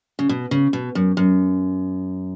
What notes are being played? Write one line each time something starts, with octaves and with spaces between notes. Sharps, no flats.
C#3
B2
C#3
B2
F#2
F#2